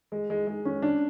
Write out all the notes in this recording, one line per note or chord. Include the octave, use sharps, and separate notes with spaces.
G#3
G#3
G#3
C#4
D4